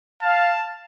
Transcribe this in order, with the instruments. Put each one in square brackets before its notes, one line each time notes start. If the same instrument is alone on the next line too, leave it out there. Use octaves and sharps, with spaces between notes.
[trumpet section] F5 [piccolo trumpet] A5